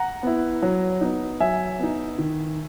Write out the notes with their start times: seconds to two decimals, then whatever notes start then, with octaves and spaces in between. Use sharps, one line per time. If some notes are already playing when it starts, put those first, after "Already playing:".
Already playing: F#5 A#5
0.23 B3 E4
0.62 F#3
1.01 B3 D#4
1.40 F#3 E5 G#5
1.79 B3 D#4
2.18 D#3